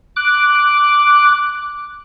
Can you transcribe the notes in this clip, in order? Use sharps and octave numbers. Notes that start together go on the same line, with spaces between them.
D6 F#6